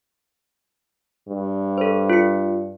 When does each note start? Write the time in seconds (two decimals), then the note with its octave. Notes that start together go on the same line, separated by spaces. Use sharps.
1.29 G2
1.78 A4 C5
2.10 F4 C#7